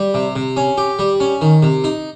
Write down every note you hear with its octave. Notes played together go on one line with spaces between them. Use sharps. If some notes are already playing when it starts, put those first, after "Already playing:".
Already playing: G3
C3
C3
C#4
G4
G3
C#4
D#3
C3
D#4